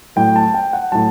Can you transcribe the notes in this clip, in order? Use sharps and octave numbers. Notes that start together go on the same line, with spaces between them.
A2 F#3 G5
A5
G5
F#5
A2 F#3 A5